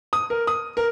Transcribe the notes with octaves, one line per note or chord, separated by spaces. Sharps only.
D#6
A#4
D#6
A#4